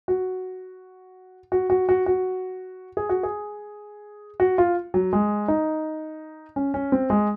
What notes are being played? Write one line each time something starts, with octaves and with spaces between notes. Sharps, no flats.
F#4
F#4
F#4
F#4
F#4
G#4
F#4
G#4
F#4
F4
F#3
G#3
D#4
C#4
C#4
C4
G#3